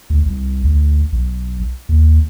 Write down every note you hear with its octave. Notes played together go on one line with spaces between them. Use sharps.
D2
C2
D2
B1
D#2